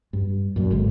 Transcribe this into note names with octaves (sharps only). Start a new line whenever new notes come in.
G2
F#2 A#2
G#1 D3 G#3